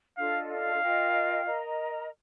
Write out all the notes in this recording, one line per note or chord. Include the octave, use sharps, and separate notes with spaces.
D4 F4 A4 D#5 F5
F5
F4 A#4 D#5 G5
A#4 D#5 A#5